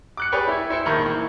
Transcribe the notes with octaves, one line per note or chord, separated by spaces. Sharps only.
D6 F#6 C#7
G4 G#4 B4 C#5 D5 G5
E4 G#6
E4 C5 C#7
A#1 D#3 A#3 A#5 B5 C#6
E3 A#3